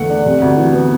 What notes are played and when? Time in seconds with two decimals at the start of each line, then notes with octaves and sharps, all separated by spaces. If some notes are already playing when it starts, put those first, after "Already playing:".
Already playing: E2 D3 A3 F#5
0.09 D4
0.26 C3
0.42 D2
0.57 E3
0.74 B3